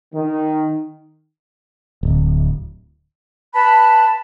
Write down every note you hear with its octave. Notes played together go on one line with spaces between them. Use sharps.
D#3
D1
B4 A5 B5